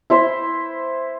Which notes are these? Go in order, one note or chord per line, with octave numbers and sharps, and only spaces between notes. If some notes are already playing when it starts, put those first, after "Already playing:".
E4 C5 E5 C6